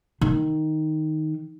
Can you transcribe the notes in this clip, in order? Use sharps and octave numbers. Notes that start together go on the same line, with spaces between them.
D#3